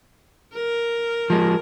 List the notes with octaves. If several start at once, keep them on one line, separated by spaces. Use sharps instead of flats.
A#4
F3 G#3